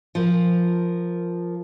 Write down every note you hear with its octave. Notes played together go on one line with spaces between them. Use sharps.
F3 A#4